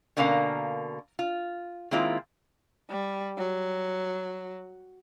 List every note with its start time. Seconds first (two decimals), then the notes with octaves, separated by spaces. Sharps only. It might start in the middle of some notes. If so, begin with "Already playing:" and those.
0.17 B2 D3 A#3 C#4 A#4 F5
1.19 F4
1.91 D#3 G#3 A#3 C4 E4 F4
2.90 G3
3.38 F#3